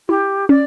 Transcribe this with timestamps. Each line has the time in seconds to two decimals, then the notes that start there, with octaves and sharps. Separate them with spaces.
0.08 E4 G4
0.49 C#4 D5